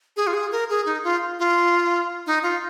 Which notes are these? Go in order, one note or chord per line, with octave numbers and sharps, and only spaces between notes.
G#4
F4
G#4
A#4
G#4
D#4
F4
F4
D#4
F4